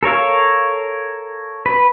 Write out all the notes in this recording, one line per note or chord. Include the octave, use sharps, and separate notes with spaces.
A4 A#4 C#5 F5
B4